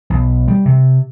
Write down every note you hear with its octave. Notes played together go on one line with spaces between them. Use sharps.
B1
G3
C3